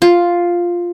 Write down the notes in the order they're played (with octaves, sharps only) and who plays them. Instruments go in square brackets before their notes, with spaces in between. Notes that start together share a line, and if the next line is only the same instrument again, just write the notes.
[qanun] F4